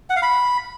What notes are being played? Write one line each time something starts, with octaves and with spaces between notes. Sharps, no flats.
F#5
F5
B5